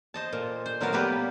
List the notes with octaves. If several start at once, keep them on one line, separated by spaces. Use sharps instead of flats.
C5 D#5 A5
A#2
C5
A#2 F#3 B3 A#4 F5
G3 A#3 B3 G4 B4